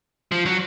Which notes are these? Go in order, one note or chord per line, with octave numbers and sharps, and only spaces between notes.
F3
F#3